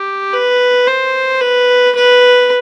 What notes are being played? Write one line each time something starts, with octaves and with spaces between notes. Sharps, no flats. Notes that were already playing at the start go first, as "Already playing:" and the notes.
Already playing: G4
B4
C5
B4
B4